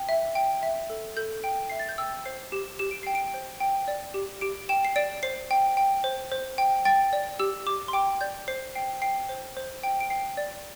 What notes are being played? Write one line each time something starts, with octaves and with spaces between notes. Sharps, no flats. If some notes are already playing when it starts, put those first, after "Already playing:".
Already playing: G5
E5
G5
E5
A4
A4 G6
G5
E5 C7
A6
G6
G5 E6
C5 C7
G4 E7
G4 E7
D7
G5 C7
D7
C5
G5
D5
G4
G4 D7
G5 E7
C7
D5 D7
C5 C7
G5
G5
C5
C5
G5
G5 A6
D5
G4 E6
G4 D6
C6
G5 D6
D5 G6
C5 C7
G5 C7
G5 C7
C5
C5
G5
D7
G5 C7
D5